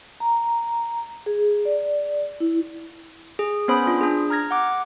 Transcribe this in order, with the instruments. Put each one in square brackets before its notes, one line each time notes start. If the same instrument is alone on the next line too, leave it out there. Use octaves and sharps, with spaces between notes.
[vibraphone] A#5
G#4
D5
E4
[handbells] G#4
B3 C#4 C5 B5 D#6
D4 F4
D4 G#4
A#5 F6 G#6 A#6
F#5 D6